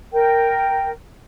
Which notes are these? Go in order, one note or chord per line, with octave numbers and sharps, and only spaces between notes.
A#4 G5